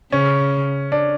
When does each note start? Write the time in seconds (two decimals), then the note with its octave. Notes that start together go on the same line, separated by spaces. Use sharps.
0.12 C#3 C#4
0.92 D4